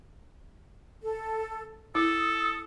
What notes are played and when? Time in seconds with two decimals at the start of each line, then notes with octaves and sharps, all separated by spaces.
1.03 A4
1.95 E4 A4 D#6